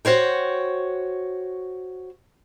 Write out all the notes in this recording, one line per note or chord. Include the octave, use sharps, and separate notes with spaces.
F#4 C5 C#5 G5